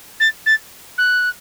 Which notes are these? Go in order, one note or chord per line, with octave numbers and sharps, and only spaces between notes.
A6
A6
F#6